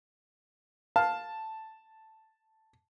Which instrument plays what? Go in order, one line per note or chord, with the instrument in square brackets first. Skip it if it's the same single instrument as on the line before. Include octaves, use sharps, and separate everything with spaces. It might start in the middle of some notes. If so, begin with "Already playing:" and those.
[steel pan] F5 [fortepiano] A5